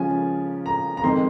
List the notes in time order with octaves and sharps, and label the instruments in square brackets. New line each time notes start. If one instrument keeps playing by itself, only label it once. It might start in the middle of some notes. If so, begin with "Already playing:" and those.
Already playing: [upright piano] C#3 F3 G#3 C#4 F4 G#5
A#5
A#5
F2 D#3 G#3 C4 C6